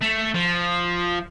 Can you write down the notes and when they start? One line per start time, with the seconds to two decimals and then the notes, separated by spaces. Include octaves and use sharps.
0.01 A3
0.34 F3